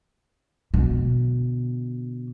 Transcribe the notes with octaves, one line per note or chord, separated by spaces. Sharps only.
B2 D3